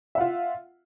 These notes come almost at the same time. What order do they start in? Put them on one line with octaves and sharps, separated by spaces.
E5 F#5 F4